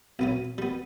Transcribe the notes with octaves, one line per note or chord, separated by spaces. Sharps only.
B1 B3 C#4
G3 B3